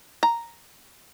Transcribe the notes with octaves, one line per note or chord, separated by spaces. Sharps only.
A#5